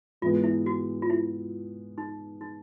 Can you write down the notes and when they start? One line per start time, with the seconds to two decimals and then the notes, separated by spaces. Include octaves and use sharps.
0.22 G#2 E3 G#3 B3 F4
0.44 E4
0.66 F#4
1.02 F4
1.10 E4
1.98 D#4
2.41 D#4